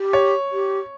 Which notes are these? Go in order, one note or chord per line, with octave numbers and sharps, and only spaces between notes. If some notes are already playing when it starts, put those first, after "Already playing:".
Already playing: G4
C#5
G4